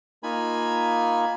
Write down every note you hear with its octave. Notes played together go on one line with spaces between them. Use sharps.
A#3 D#4 F4 G#5 B5